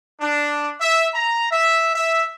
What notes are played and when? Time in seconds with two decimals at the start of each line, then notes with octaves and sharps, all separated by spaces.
0.21 D4
0.80 E5
1.14 A#5
1.51 E5
1.95 E5